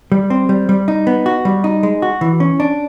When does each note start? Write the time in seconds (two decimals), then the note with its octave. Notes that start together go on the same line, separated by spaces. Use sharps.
0.12 G3
0.30 C4
0.49 G3
0.69 G3
0.88 D#4
1.07 B3
1.26 F#4
1.45 G3
1.64 D#4
1.83 G#3
2.02 F#4
2.21 E3
2.40 C#4
2.60 D4